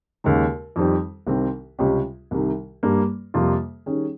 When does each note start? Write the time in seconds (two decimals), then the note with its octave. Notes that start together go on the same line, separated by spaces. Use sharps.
0.24 D#2 C#3 G#3
0.76 F2 D#3 G3 C4
1.27 C2 C3 D#3 G3 C4
1.79 C#2 C3 G3 C#4 G4
2.31 C2 C3 D#3
2.83 G2 G3 A#3
3.34 F2 C3 G3 A#3 F4
3.86 D#3 G3 C#4 G#4